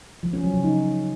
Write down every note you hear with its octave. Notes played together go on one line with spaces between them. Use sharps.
F3
C#4
F#3
C#3
D#4